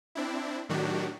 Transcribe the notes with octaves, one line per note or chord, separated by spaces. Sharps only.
C4 D4 E4
A2 D#3 F#3 D4 F#4 G4